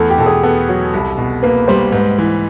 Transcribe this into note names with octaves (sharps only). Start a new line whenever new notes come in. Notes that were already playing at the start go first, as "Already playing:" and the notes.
Already playing: E2 A3 A4
G4
B2 A4
G#4
B3 A4
F#3
C2
B2
A#3 B4
G3 C5
G#2 B4
E3